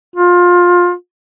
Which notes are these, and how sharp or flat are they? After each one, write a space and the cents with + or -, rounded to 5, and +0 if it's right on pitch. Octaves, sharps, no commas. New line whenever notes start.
F4 +20